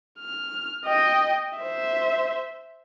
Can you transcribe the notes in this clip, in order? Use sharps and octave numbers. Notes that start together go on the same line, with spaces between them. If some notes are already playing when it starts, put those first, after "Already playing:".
F6
D#5 G5
C5 E5